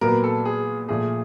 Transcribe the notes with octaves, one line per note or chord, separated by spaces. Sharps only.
A#2 F#3 B3 A#4
A4
G#4
A#2 F3 A3 G#4